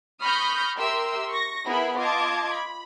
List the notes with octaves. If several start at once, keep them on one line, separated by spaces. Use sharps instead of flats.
B5 C#6 D#6 F6 G6 A#6
G4 A#4 E5 C6 E6
C#6 A#6
B3 E4 G#4 A#4 B5
F4 D#5 A5 D6 G#6
B5